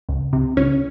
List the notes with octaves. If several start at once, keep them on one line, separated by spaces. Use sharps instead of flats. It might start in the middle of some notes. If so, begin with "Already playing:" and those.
C#2
C3
C#2 C#4